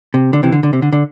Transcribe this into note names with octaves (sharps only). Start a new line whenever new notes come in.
C3
D3
C3 E3
D3
D3
C3
D3
D3